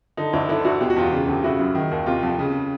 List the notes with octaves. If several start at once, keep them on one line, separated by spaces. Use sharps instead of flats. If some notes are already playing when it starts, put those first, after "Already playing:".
D3 D#4
D2 D4 E4
D3 D4 E4
D2 E4 F#4
B2 G4
F#4
E2 F4 G4
C#3
D2 G4
C#3 E4 F#4
F#2
D#3
D#2
C3 F4 G4
F2
C#3